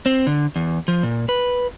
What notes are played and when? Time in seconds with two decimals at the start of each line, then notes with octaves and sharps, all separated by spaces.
0.06 C4
0.27 D3
0.56 E2
0.88 F3
1.03 A#2
1.29 B4